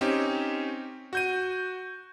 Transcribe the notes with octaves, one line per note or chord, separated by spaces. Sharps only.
C4 C#4 D#4 G4
F#4 G6 D#7